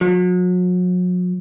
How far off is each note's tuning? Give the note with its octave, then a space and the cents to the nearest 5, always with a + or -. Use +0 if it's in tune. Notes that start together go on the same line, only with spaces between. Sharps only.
F#3 -40